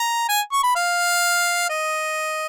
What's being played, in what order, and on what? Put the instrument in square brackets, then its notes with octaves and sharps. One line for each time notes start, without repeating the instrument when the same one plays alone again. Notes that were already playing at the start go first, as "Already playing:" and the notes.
Already playing: [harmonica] A#5
G#5
C#6
B5
F5
D#5